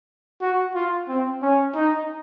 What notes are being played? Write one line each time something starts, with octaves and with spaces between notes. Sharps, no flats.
F#4
F4
C4
C#4
D#4